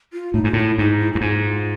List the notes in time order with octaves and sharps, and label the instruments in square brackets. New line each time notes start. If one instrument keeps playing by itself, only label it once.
[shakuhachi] F4
[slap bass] A2 [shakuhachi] D#4
[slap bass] G#2 [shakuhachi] F4
[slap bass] A2 [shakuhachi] E4
[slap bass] G#2 [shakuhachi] D#4
[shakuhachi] E4
[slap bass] G2 [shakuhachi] E4
[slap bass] G#2 [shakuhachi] F4